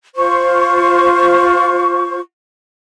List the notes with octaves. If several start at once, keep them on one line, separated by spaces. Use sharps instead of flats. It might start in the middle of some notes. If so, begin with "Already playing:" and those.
F4 C5 C#6